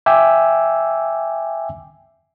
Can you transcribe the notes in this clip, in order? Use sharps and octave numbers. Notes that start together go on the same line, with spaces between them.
E5 G5 G#5 D6 E6